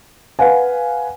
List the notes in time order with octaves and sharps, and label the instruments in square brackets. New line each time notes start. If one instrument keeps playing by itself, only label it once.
[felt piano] B4 F5 F#5 G#5